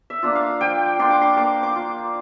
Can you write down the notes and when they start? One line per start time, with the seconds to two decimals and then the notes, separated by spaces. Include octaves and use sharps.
0.10 E5
0.22 A#3 D4 F4
0.35 F5
0.61 F3 G5
0.99 A#3 D4 F4 C6
1.10 D6
1.22 C6
1.37 A#3 D6
1.63 D6
1.76 F4